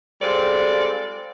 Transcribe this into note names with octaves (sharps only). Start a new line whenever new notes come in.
G3 G#3 C4 F4 A4 D5